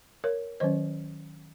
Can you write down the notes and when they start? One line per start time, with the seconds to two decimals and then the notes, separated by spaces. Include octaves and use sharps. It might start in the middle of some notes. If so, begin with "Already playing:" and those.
0.24 A#4 C#5
0.60 D#3 F#3 C#4 C5 D#5